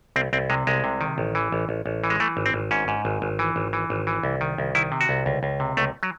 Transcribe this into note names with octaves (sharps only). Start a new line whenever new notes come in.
C2 C4
C2 C4
C3 G#3
C2 G#3
C3
D#3
A1
E3
A1
A1
A1
E3
G#3
E3 A3
G#1
C4
G#1
G#2 C#4
G#2
G#1
G#1
E3
G#1
E3
G#1
E3
C2
D#3
C2
D#3 E4
C3
F#4
C2
C#2
C#2
C3
C#2 A3
F#3